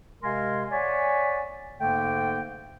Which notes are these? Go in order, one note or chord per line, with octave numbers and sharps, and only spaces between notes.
C3 G#3 A#4 F5 G#5 C6
C#5 D5 E5 F#5 G#5
G#2 D3 A3 A#3 G5